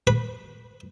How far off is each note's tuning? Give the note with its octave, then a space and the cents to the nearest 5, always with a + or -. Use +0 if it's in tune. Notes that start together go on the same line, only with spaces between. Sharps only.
B4 -15 B5 +0